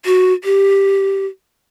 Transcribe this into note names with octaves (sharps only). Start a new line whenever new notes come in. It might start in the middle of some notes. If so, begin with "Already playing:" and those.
F#4
G4